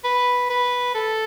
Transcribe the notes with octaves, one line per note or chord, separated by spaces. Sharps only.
B4
B4
A4